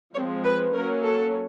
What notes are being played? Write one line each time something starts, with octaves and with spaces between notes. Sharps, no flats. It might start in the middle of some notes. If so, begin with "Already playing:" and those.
F3 G#3 C4 C#5
B4
F#3 A#3 C#4 A#4
A4